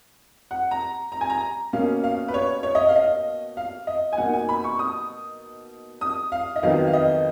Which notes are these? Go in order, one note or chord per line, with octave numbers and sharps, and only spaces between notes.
F#5
A#5
A#5
G#5
A#5
B2 A#3 C#4 F5
F5
B4
C#5
C#5
D#5
F5
D#5
F5
D#5
G#5
B2 A#3 D#4 F#5
G#5
B5
C#6
D#6
D#6
F5
D#5
F2 D#3 F#3 B3 F5
F5
D#5